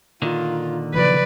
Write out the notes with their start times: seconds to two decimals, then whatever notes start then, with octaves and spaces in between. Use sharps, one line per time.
0.22 A#2 D3 D#3 F4
0.94 C#3 F3 F#3 B4 D5